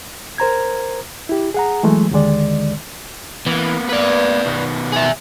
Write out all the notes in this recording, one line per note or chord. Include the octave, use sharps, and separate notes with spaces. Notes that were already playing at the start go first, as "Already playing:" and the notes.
A#4 C5 A#5 G#6
E4 G4
G#4 F#5 A#5
E3 F#3 G#3 A3
D#2 D3 D#3 G#3 D5
E3 A#3 B3
B4 D5
B2 D#3 B3
G#4 E5